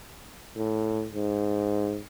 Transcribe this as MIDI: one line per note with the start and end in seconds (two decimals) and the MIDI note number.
0.56 1.07 45
1.14 1.99 44